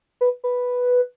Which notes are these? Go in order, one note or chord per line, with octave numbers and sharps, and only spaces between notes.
B4
B4